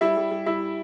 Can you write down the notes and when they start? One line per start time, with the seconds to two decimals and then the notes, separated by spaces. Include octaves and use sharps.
0.01 G3 E4 E5
0.17 G3
0.31 G3
0.46 G3 E4 E5